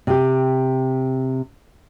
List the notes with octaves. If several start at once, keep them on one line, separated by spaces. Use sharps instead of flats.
C3 G4